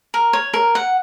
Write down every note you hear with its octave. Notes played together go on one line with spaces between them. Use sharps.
A#4
C#5
A#4
F#5